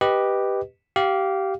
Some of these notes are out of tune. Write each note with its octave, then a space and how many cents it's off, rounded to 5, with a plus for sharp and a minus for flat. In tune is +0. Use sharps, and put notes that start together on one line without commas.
G4 +0 B4 +0 D#5 +0
G4 -20 F5 +0